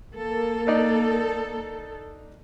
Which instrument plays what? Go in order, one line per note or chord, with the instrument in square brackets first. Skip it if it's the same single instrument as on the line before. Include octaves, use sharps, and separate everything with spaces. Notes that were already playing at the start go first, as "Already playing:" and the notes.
[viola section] A#3 [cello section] A4
[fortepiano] D4 D#4 D5